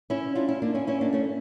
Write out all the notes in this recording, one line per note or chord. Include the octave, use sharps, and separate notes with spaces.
C#4 E4
D4 F4
C#4 E4
A#3 D4
C#4 E4
C#4 E4
A#3 D4
A3 C#4